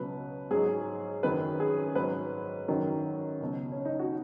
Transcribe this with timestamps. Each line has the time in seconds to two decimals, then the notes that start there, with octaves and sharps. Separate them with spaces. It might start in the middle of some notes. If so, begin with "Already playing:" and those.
Already playing: C#2 B2 F#3 B4
0.51 G#2 F#3 G#4
1.23 F#2 D#3 F#3 B4
1.60 G#4
1.95 G#2 F#3 B4
2.68 F#2 D#3 F#3
3.40 C#2 B2 F#3
3.72 C#4
3.85 D#4
3.99 F#4